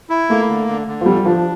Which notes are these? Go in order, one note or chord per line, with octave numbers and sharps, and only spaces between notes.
E4
A3 A#3
D3
D3
D3
F3
E2 G3
F3 D4